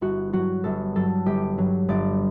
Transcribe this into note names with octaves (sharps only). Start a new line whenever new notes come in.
G1 F#4
G2 F#3 F#4
G1 A4
G2 F#3 A4
G1 G4
G2 F#3
G1 D5